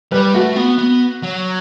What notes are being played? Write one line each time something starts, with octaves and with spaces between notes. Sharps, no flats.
G3 B4
A3 F#4
B3
B3
F#3